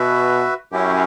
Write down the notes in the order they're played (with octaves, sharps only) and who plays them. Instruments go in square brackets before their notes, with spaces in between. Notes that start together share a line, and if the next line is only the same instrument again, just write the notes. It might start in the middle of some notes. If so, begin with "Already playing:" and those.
Already playing: [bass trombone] B2 [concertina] F#4 B4 E5
[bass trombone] F#2 [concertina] C#4 E4 G4